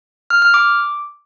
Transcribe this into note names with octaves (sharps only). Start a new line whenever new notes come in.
F6
F6
D6